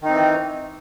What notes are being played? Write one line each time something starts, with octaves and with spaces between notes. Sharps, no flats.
D#3 E3 C4 D#4